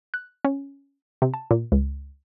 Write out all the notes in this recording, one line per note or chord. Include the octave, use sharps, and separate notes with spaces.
F#6
C#4
C3
A5
A#2
C#2